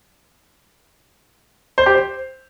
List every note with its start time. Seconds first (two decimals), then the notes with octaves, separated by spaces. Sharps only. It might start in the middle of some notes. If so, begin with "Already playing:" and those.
1.78 C5
1.86 G4
1.95 C5